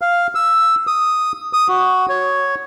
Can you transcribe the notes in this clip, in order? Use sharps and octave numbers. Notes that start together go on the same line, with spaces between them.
F5
E6
D#6
D#6
F#4
C#5